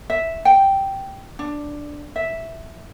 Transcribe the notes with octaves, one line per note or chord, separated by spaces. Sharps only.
E5
G5
D4
E5